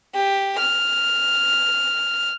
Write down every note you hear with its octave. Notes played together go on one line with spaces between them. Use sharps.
G4
F6